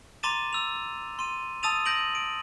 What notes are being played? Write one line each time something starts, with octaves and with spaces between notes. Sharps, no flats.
A#5 C6 D6 A6 D#7 E7
E6 F7
C6 D#7
A5 D#6 E6 A6 D#7 F7
G6 A#6 D7 F#7
D7